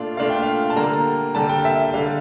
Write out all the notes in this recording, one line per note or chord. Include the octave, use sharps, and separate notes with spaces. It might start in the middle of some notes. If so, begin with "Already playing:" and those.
Already playing: A#2 A3 D4 F4 F5
A#2 A3 D4 F4 F5
G5
F5
A5
D3 G3 A#3 A#5
D3 G3 A#3 A5
G5
E5
E5
D3 G3 F5